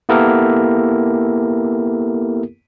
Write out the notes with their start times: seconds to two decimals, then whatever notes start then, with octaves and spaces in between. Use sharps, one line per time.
0.09 A#3 B3 E4 G4 A4 A#4